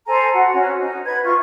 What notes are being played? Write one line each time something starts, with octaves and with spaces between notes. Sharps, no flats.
A4 C5 G#5 A#5
F#4 F#5
C#4 F#4
D#4
B4 G#6
E4 F4 C#6